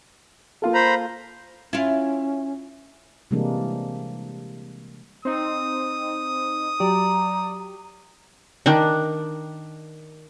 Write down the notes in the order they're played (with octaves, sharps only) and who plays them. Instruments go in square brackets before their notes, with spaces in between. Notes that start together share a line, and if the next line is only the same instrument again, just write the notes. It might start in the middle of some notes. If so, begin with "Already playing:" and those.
[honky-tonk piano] A#3 F4 A4
[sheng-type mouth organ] C5 A#5 B5
[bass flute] C#4 [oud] E4 F4
[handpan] C3 E3 G3 G#3 A#3 D4
[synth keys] C4 D#4 [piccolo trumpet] D#6
[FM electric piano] F#3 G4 [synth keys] D5 [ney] A#5
[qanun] D#3 D4